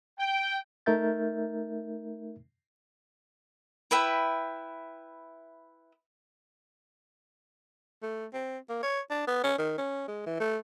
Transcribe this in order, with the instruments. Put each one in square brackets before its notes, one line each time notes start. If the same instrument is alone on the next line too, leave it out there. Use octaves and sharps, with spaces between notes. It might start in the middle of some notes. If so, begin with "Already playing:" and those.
[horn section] G5
[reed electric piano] A3 D#4 A#4 E5 G6 A6
[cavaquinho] E4 B4 E5 G5
[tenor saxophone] A3
C4
A#3
C#5
D4
B3
C#4
D#3
C#4
G#3
E3
A3